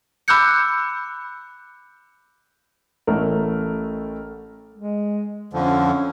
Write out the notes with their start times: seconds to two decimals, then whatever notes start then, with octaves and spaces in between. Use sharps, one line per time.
0.28 B5 D6 E6 F#6 G6 C#7
3.07 A1 A3 A#4
4.76 G#3
5.53 F2 D3 F3 C#4